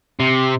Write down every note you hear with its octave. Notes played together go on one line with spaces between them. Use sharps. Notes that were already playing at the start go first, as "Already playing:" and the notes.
C3